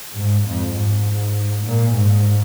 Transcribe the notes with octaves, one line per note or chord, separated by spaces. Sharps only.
G#2
F2
G#2
A#2
G#2